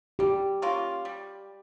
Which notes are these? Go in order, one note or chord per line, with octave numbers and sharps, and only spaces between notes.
G3 G4
A#3 C#4 F4
G3